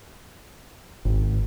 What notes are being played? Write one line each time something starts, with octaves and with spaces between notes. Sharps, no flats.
G#1